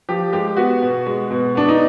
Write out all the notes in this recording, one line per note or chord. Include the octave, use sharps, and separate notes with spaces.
F3 G4
G#3 G4
B3 F#4
B2
G#3
B2
B3 D4
D#4